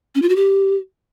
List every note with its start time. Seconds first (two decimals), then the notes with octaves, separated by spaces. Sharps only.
0.15 C#4
0.22 F4
0.29 F#4
0.36 G4